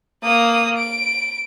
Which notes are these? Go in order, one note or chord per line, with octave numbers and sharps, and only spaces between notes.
A#3 D#6
D7